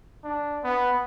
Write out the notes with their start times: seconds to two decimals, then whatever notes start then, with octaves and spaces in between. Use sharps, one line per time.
0.24 D4
0.63 B3